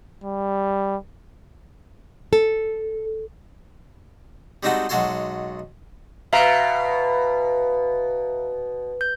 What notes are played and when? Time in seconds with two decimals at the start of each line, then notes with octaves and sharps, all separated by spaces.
0.24 G3
2.33 A4
4.63 G3 G#3 C4 D#4 F#4 A4
4.89 B1 G#3 F#4 A4 C#5 C6
6.33 B2 E5 F5 A#5
9.01 G6